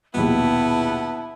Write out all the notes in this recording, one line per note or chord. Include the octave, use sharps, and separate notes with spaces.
A#1 D#2 B2 B3 E4 A5